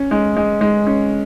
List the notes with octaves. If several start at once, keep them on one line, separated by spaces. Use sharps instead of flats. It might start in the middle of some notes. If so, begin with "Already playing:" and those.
Already playing: C#4
G#3
G#3
G#3
C#4